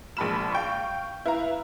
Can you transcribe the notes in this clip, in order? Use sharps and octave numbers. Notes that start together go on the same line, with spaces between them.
A#1 G#3 A5 B5 F6 E7
F5 G5 C#6
E4 B4 F5 A#5